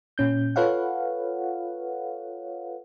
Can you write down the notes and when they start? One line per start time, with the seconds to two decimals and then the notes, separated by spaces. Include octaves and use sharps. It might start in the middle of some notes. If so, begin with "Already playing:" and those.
0.18 A#2 C#4 G6
0.56 F4 A4 B4 C#5 F5 F#5